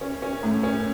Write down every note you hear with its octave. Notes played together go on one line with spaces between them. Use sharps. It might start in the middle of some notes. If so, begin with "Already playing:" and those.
C#4
C#4
A2
C#4